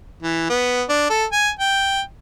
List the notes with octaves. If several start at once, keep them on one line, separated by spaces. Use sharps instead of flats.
E3
B3
D4
A4
G#5
G5